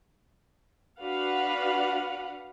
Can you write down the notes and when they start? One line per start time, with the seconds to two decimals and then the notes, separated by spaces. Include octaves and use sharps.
1.00 D4 F#4 B4 F5 F#5